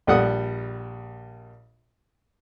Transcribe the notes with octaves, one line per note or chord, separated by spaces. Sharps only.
A#1 G3 F#5 D#6